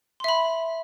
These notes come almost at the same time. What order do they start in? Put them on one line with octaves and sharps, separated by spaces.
C6 E5 B5